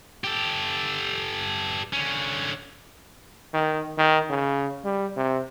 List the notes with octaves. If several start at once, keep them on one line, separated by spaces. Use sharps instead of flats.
G4 A4
D3 C#4
D#3
D#3
C#3
G3
C3